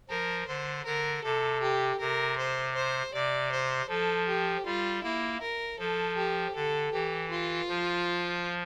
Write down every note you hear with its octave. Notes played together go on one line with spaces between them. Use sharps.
F3 A#4
D3 C5
D3 A#4
C3 A4
G4
C3 A#4
C5
C5
C3 D5
C5
F3 A4
G4
G3 F4
A#3 E4
A#4
F3 A4
G4
D3 A4
E3 G4
F4
F3